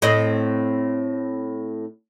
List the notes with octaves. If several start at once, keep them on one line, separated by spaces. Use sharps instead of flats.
A2 C4 D#5